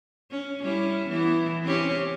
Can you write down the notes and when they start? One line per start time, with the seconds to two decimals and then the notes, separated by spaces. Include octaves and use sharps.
0.31 C#4
0.62 G3 C#4 E4
1.09 E3 B3 E4
1.63 C4 C#4 G4